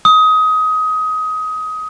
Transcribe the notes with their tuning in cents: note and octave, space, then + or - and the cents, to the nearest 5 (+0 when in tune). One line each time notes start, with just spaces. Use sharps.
D#6 +20